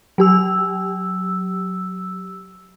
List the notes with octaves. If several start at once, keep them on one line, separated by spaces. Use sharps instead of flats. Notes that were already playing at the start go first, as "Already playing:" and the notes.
F#3 G4 E6